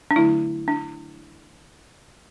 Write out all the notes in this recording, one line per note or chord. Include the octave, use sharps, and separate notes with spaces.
D4
D3 F#3 A3 E4
D4